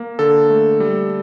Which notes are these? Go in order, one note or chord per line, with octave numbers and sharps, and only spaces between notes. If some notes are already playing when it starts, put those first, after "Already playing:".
Already playing: A#3
D3 A4
A3
G3